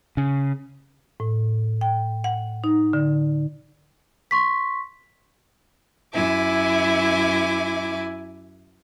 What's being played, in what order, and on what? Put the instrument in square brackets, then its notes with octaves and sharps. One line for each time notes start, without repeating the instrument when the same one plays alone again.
[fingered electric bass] C#3
[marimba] A2
G5
F#5
D#4
D3
[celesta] C6 C#6 B6
[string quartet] F#2 E4 E5 G#5 D6